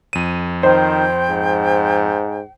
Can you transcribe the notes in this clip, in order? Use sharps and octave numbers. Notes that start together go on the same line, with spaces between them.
F2 D#7
D#3 C5 G5
G#2